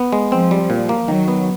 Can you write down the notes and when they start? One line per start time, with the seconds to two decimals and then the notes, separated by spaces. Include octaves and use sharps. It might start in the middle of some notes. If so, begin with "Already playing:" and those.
Already playing: B3
0.13 G#3
0.32 F3 C4
0.51 G3
0.70 A#2
0.89 A#3
1.08 D#3 F#3
1.28 B3